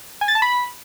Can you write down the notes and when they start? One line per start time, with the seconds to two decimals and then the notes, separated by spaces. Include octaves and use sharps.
0.21 G#5
0.28 A6
0.35 A5
0.42 B5